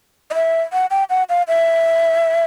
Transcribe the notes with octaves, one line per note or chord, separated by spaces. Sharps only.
D#5
E5
F#5
G5
F#5
F5
E5